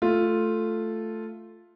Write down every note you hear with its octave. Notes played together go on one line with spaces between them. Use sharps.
A3 F4